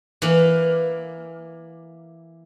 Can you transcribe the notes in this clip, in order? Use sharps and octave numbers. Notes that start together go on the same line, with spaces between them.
E3 A#3